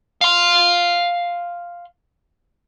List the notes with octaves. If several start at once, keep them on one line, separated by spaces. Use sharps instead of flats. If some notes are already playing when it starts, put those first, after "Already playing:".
F5 C6